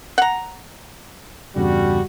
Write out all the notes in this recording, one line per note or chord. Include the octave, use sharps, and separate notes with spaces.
F#5 A#5
E2 G2 C#3 G3 F#4